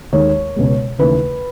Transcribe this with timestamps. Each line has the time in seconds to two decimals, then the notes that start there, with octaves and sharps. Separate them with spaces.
0.13 D#2 D#3 G#3 C#5
0.56 C#2 B2 G#3
0.99 D#2 C#3 E3 A3 B4